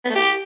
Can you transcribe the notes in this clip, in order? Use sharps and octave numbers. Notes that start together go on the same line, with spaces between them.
B3
A3
G4